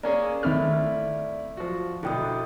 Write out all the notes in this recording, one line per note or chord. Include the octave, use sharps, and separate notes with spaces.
A#3 C#4 G#4 D5
D#3 A3 C4 E4 F6
F3 F#4
B2 D3 E4 G5 D#6